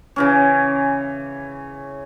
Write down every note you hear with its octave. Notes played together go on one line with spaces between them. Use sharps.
C#3 E3 C#4